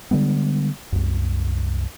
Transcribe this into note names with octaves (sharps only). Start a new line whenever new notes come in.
D3 G3 G#3 B3
C2 F#2